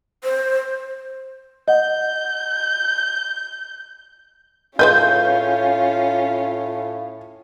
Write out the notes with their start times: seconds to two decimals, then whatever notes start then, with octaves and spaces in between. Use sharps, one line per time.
0.24 C5
1.68 D#5 F#5 G6
4.79 A2 G#3 C#4 F4 B4 D#5 G6